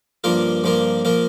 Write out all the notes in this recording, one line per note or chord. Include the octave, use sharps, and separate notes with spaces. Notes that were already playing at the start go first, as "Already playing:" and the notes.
G2 F3 A#3 F4 A#4
G2 F3 A#3 F4 A#4
F3 A#3 F4 A#4